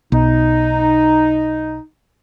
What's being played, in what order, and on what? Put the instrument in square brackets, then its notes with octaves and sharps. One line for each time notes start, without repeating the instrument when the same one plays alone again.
[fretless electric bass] B1 [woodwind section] D#4